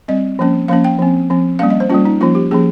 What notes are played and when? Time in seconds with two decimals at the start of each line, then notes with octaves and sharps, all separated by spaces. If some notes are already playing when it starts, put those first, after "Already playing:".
0.08 G3 C4 D#5
0.39 F3 A#3 C#4
0.68 F3 A#3 C#4 F5
0.84 G5
0.99 F3 C4
1.30 F3 C4
1.59 G3 A#3 C#4 F5
1.70 D#5
1.80 C5
1.90 G3 A#3 C#4 F4
2.05 D#4
2.21 F3 A#3 C#4 F4
2.35 G4
2.51 F3 A#3 C#4 G#4